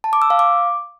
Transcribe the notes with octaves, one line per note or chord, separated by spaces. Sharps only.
A5
D6
E6
F5
D6